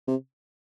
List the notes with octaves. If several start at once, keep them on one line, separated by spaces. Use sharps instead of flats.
C3